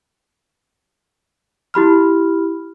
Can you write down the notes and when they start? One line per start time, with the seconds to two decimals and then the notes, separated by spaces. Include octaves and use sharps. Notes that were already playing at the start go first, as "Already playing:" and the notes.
1.74 E4 G4 B5 F6